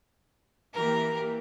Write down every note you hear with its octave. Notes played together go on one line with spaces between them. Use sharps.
E3 A#3 G4 A#4